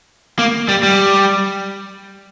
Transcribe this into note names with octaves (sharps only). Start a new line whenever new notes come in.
A#3
G3
G3